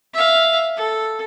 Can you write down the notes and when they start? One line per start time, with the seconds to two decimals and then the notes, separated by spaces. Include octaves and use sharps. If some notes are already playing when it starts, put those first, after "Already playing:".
0.14 E5 F5
0.76 A4